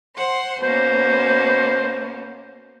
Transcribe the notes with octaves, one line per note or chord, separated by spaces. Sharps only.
C5 F#5 C6
B2 A#3 C#4 C5